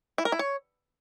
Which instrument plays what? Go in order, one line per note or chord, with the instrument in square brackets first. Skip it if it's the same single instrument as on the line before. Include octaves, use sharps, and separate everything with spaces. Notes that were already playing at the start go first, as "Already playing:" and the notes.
[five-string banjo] E4
A#4
E4
C#5